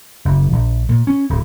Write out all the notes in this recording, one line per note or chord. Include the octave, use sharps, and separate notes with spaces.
F#1
A#1
A#2
C#4
D1